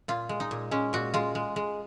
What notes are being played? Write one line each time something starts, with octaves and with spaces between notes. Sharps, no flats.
A#2 F4
G#3
D#4
A#2
G#3 C#4
A#2 F#4
G#3 F4
G#3
G#3